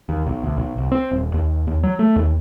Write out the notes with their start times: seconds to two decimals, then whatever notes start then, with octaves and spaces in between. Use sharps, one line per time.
0.09 D#2
0.27 B1
0.43 D2
0.57 B1
0.78 C2
0.92 C4
1.11 D#1
1.34 D#2
1.67 D#2
1.83 F#3
1.99 A3
2.16 D#2